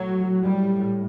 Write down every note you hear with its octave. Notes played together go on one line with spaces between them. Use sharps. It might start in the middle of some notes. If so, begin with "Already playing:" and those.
Already playing: A2 F#3
G3